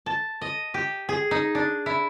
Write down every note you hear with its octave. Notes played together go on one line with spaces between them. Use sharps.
A5
D#5
G4
G#4
D#4
D4
E4